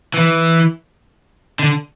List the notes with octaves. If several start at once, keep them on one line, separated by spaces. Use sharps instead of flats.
E3
D3